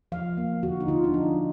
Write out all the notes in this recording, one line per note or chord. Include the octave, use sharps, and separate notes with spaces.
F3 F5
A#3
D3 F#4
D#4
D3 F4
D4
F3 D#4